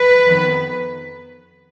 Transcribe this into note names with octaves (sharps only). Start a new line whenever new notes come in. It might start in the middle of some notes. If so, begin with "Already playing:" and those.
Already playing: B4
F2 D#3 B3